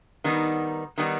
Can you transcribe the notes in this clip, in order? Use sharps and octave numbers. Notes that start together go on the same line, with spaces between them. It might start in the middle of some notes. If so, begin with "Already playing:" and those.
D#3 G3 B3 D#4
D#3 G3 B3 D#4